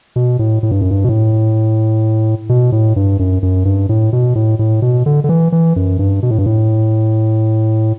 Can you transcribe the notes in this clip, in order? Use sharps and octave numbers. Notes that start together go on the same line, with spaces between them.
B2
A2
A2
G2
F#2
G2
B2
A2
B2
A2
G2
F#2
F#2
G2
A2
B2
A2
A2
B2
D3
D3
E3
E3
F#2
G2
B2
A2
G2
A2